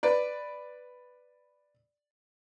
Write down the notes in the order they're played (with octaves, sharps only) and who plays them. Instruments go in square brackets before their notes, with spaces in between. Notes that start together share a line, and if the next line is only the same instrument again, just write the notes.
[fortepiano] B4 D5